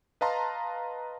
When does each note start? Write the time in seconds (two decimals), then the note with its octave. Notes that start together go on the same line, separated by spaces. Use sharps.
0.21 B4 D#5 F5 A5 A#5 C6